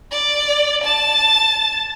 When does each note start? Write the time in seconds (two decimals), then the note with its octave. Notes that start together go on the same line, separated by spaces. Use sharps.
0.11 D5
0.84 A5 A6